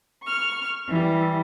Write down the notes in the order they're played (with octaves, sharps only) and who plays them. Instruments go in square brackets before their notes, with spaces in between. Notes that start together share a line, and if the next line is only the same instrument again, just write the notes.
[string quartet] C#6 F6
E3 G3